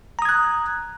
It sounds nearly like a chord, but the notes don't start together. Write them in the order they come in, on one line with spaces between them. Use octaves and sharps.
A#5 D#6 G#6 F#6